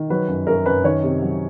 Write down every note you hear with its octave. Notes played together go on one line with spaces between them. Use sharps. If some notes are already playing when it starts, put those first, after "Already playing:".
Already playing: D#3
F#3 B4
F#2
F#2 A#4
F#2 B4
D#3 C#5
C3
F#3